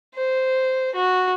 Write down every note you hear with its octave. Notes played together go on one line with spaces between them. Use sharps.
C5
F#4